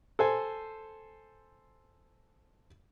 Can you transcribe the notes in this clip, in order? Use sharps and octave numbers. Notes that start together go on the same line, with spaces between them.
A4 C5 G#5